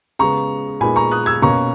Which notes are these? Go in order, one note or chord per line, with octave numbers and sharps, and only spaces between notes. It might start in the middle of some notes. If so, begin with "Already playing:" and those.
C#3 G#3 B3 A#5 C#6
A#2 G#3 B3 D#4 G#5 B5
A#5 C#6
D#6 F#6
E6 G#6
B2 A#3 C#4 A#5 C#6